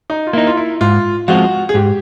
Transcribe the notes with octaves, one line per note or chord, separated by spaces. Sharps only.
D#4
F4
A#3 D#4 E4
F4
E4
G#2 F4
F3 G#3 C4 F4 F#4
G#4
G#2 G4